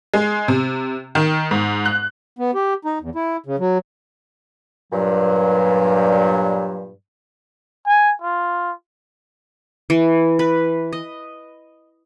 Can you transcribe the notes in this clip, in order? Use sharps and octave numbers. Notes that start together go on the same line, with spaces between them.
G#3
C3
D#3
G#2
F#6
B3
G4
D#4
E2
E4
C#3
F#3
G2 A#2 F#3
G#5
F4
E3
B4
D#5